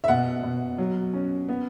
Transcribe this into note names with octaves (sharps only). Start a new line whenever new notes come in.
E5
B2 F#5
B2
F#3
C#4
B3